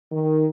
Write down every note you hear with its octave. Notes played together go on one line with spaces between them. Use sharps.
D#3